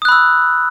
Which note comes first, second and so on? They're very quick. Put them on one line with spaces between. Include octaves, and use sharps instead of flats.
D#6 F#6 B5 E6